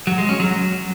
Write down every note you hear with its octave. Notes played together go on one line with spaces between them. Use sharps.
F#3
G#3
C#4
F#3